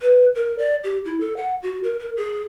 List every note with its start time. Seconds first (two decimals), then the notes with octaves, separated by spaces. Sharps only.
0.02 B4
0.35 A#4
0.59 D5
0.84 G4
1.05 E4
1.20 A4
1.37 F#5
1.63 F#4
1.84 A#4
1.99 A#4
2.17 G#4